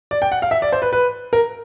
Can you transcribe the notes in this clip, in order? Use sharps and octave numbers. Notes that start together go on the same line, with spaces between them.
D5
G5
F#5
F5
E5
D5
C5
B4
B4
A#4